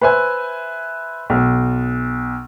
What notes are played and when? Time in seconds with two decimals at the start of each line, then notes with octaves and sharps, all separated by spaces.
0.02 B4 C5 E5 G#5
1.30 B1